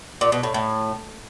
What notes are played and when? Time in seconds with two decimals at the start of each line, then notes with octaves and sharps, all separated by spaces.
0.21 A#2
0.32 B2
0.43 A2
0.54 A2